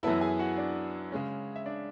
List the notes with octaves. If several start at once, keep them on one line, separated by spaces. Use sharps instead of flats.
F#2 E3 B3 E4 A4 A5
G#4 G#5
F#4 F#5
D4 D5
C#3 G#3 C#4
E5
D4 D5